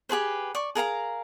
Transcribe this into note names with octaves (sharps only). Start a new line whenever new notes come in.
G4 G#4 B4 C5
D5 C#6
G#4 A#4 F5 A#5